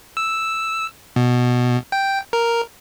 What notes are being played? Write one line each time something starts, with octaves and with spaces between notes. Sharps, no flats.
E6
B2
G5
A#4